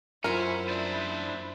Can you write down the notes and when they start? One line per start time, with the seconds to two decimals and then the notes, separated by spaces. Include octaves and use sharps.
0.24 F#2 C#4 E4 F4 A#4 C5
0.68 D4 E4 C5